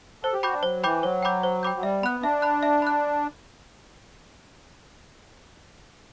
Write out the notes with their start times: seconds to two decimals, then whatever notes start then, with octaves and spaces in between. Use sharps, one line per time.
0.23 A4 C5
0.33 G4
0.43 F#4 G5 B5 D6 G6
0.53 D4
0.63 F#3 C5
0.83 E3 G5 B5 D6 G6
1.03 F#3 C5
1.23 G5 B5 D6 G6
1.43 C5
1.63 G5 B5 D6 G6
1.76 F#3
1.83 G3 E5
2.03 B3 B5 F#6
2.23 D4 E5
2.42 B5 F#6
2.63 E5
2.82 B5 F#6